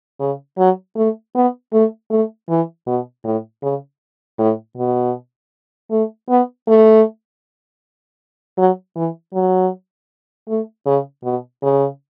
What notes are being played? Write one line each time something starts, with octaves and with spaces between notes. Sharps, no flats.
C#3
F#3
A3
B3
A3
A3
E3
B2
A2
C#3
A2
B2
A3
B3
A3
F#3
E3
F#3
A3
C#3
B2
C#3